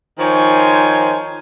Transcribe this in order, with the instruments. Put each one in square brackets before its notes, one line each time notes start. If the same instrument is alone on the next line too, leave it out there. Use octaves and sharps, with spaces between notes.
[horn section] D#3 F3 C5 C#5 G#5